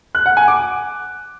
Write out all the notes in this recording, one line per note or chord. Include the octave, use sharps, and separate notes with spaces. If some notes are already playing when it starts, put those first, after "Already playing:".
F#6
F#5
G#5
D6